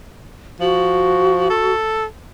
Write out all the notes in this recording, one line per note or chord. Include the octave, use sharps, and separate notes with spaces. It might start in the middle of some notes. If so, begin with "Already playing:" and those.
F3 F#4
A4